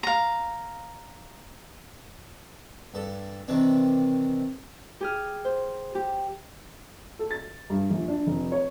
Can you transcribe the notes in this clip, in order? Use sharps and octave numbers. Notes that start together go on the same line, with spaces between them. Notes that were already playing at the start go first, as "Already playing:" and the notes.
F5 A#5
G2 A4
C3 D#3 E3 C4 D4
G4 G#4 F6
C5
G4
A4
A6
G2
A#1
D4
F1
C#5